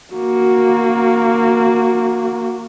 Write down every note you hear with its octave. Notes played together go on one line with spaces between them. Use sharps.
A#3 F#4